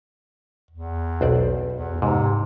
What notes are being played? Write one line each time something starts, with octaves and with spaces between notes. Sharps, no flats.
E2
B1 C5 D5
E2
G#2 C3